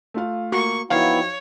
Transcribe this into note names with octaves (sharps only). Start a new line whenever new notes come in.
A3 F4 F5
A#3 F#4 C#6
F3 F#3 B3 D#4 E4 C#5 F5 G5